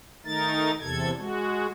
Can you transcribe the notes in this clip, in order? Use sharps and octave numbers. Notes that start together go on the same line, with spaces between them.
D#3 A3 D#4 A#4 A6
E2 C3 A4 G#6
G#3 F#4